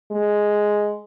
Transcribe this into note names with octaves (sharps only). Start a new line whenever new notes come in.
G#3